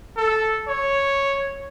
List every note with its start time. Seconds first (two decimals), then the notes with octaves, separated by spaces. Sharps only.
0.17 A4
0.68 C#5